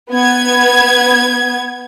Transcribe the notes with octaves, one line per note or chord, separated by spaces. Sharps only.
B3 G#6